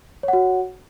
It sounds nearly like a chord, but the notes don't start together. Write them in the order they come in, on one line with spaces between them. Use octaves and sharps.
C#5 F#5 F#4